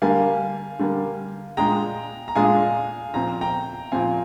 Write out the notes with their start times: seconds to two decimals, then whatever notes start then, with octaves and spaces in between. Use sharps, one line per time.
0.02 D3 G3 A#3 F5 G#5
0.79 D3 G3 A#3
1.57 A#2 G#3 D4 G#4 G5 A#5
2.28 A#5
2.35 A#2 G#3 D4 G#4 F5 G#5
3.14 A#2 F3 C4 A#5
3.41 G5 A#5
3.92 A#2 F3 C4 F5 G#5